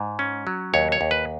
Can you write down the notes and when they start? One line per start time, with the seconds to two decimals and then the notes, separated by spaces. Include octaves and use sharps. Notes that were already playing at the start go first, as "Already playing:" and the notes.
Already playing: G#2
0.19 C#4
0.47 F#3
0.74 D#2 C#5
0.92 C#5
1.01 D#2
1.11 B4